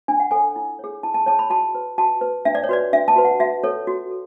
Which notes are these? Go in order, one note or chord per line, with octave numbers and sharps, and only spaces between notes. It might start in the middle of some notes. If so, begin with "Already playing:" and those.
D4 G#5
F#5
A4 C#5 G#5
E4
G#4 C#5
E4 A5
A5
G#4 C#5 A5
B5
F#4 A5
B4
F#4 A5
B4
D4 E5
D5
C#5
F#4 B4 D5
D4 E5
A5
F#4 B4
F#5
F#4 E5
A4 C#5
F#4
A4